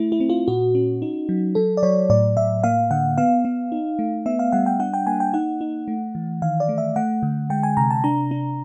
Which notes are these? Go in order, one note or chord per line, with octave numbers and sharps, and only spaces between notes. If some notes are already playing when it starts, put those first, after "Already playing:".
Already playing: A3 E4
E4
C4
F4
A#2 F#4
C#4
D#4
F#3
F#3 A4
D5
F#3 C#5
A2 D5
A2 E5
A#3 F5
D3 F#5
B3 F5
B3
D#4
A3
B3 E5
F5
G3 F#5
G5
D4 F#5
G5
A#3 G#5
G5
D#4 F#5
D#4
A3
E3
D#3 F5
D5
A3
E5
A3 F#5
D3
G#3 G5
G#5
C3 A#5
A5
D4 A#5
D4